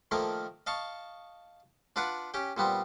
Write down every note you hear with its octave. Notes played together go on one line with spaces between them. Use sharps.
D#3 F3 A3 A#3 A#4
D#5 F5 A5 C#6
D4 F4 B4 D5 F#5
C#4 G4 G5
A#2 G3 B3 C4